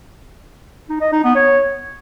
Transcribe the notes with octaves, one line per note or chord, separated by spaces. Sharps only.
D#4
D#5
D#4
B3
C#5